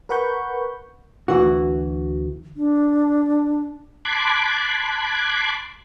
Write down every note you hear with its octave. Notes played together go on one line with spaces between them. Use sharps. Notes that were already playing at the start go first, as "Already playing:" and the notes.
A#4 B4 F#5 B5 C#6 G6
D2 E3 F#4
D4
A5 B5 C6 D6 F#6 G#6